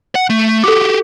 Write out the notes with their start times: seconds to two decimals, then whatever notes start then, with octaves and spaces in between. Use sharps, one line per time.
0.15 F#5
0.30 A3
0.64 F#4 G4 A4 D6